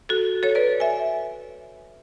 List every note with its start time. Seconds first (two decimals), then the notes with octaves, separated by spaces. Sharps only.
0.09 F#4 A4
0.43 A4 C#5
0.55 B4 D5
0.80 E5 G#5